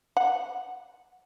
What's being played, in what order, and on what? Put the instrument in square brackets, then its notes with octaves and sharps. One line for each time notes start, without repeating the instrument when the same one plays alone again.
[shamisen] F#5